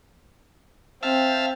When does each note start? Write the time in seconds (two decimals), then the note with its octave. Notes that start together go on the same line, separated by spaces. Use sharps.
1.03 C4 E5 F5 A5